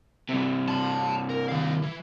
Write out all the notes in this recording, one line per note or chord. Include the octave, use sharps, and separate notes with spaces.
G2 C3
A5 C6
A#4
D#3 F5
E3